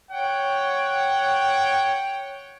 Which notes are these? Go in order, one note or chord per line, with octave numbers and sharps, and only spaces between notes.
C#5 F#5 G5